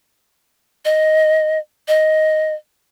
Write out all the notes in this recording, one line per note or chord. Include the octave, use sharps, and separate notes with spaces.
D#5
D#5